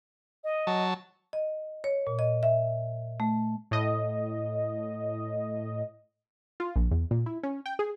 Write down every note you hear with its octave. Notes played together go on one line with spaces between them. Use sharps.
D#5
F#3 A5
D#5
C#5
A#2
D#5
E5
A3
A2 D#5
F4
A#1
E2
A#2
E4
C#4
G5
G#4